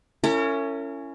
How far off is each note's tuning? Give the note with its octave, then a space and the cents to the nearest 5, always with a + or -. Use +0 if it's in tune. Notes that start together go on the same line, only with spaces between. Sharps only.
C#4 +5 E4 +25 A#4 -45